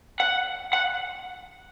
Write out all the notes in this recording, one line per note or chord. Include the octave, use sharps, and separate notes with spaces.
F#5
F#5